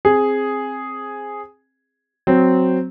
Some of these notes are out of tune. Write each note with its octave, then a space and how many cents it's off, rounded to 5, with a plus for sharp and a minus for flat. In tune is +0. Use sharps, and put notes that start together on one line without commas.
C4 +10 G#4 +0
F#3 +0 C4 -10